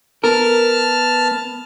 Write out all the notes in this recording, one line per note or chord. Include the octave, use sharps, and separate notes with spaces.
B3 A#4 A5 F6